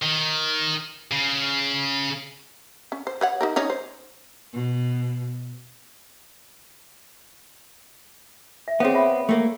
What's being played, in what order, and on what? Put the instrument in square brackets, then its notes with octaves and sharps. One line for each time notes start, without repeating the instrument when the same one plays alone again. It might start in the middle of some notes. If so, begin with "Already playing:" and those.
[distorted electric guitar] D#3
C#3
[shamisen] C#4
C5
B4 C#5 F#5
D#4 G4 A#4
C#4 D#4 C#5
C5
[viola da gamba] B2
[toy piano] E5
[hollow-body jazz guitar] B3 C4 [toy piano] G#4 C#5 F5
[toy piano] E5 G5 B5
[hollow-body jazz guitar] A3 A#3